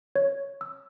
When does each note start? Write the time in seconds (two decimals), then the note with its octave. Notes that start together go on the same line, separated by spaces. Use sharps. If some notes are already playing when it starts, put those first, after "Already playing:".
0.16 C#5
0.61 E6